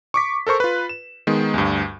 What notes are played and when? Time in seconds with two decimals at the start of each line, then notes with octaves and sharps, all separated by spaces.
0.14 C#6 D6 B6
0.47 A4 A#4 C5 C#6
0.60 F4 B4
0.89 E7
1.27 D#3 G#3 B3
1.54 D2 G2